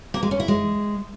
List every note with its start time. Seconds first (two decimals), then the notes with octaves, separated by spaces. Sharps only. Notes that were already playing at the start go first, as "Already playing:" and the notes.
0.14 A#3
0.23 G#3
0.31 C#4
0.40 E4
0.48 G#3